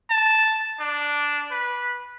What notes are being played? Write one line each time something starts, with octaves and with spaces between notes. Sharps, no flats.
A5
D4
B4